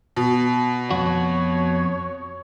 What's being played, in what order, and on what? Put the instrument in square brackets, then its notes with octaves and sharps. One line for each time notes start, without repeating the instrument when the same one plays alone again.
[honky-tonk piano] B2
[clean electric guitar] F2 F#4 [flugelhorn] C#5